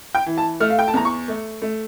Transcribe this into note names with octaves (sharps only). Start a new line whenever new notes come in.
G5
E3
A5
A3 F6
F5
G5
A5
E2 A#5
C#6
A3
A3